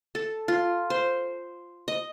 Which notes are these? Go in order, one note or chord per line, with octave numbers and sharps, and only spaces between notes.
A4
F4
C5
D#5